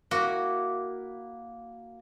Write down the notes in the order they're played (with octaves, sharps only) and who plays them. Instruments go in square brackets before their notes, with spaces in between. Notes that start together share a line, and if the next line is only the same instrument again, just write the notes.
[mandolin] A#3 E4 [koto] F#4